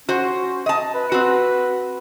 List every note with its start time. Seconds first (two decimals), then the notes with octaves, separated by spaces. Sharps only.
0.09 C#4 F#4 C5
0.66 D#5 A5
0.95 B4
1.12 C4 F#4